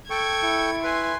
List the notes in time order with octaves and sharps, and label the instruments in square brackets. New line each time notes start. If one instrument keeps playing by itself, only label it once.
[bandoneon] A4 G5 C#6 [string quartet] G#6
[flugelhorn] E4
[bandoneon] B4 [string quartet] G#5 C6